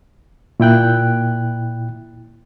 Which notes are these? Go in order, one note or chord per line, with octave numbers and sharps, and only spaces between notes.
A#2 E4 G5 F#6